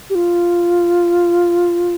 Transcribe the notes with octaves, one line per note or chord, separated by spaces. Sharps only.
G4
F4